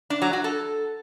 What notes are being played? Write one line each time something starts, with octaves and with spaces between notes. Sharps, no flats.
D4
F#3
F#4
A4